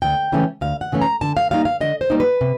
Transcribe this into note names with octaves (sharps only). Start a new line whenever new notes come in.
D2 G5
C#3 E3 A3 C#4
D2 F5
F#5
C#3 E3 A3 C#4
A#5
D3 A5
F5
G3 A#3 D#4 F5
F5
D3 D#5
C5
G3 A#3 D#4
B4
C3